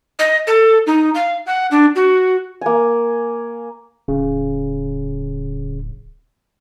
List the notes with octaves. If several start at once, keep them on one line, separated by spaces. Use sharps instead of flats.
D#5
A4
D#4
F5
F#5
D4
F#4
A#3 G#5
D1 C#3